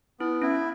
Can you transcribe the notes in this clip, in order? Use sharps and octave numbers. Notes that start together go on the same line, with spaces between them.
B3 E4
C#4 E4